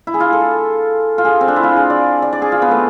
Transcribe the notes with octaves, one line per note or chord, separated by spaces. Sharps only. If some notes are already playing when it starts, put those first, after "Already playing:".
E4
G#4
F4
A4
F4
G#4
C4
D4
E4
F4
G#4
D5
D5
D5
G#4
F4
B3
A3